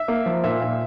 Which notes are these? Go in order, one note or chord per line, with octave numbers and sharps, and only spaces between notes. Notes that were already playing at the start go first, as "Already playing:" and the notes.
Already playing: E5
A#3
F3
A#2 E5
A#2